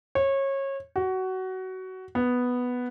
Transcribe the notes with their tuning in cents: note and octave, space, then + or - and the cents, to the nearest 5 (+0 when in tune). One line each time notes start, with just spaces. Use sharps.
C#5 -25
F#4 +20
B3 +0